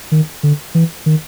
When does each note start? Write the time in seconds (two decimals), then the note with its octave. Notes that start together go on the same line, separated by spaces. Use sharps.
0.12 D#3
0.43 D3
0.75 E3
1.06 D#3